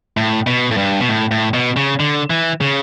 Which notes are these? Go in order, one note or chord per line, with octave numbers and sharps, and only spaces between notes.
A2
B2
A2
G2
B2
A2
A2
B2
C#3
D3
E3
C#3